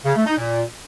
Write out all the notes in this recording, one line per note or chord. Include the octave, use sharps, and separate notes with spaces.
C#3
A3
D#4
A#2